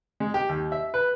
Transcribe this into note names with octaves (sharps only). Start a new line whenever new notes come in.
G#3
G4
D#2
E5
B4